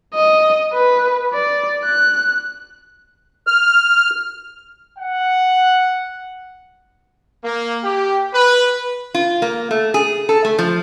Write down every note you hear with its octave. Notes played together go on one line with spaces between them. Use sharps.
D#5
B4
D5
F#6
F6
F#5
A#3
G4
B4
F4
A#3
A3
G#4
A4
A3
F3